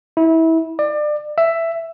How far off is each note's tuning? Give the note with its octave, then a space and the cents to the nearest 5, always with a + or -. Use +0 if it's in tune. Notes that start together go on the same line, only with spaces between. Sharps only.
E4 -25
D5 +30
E5 +10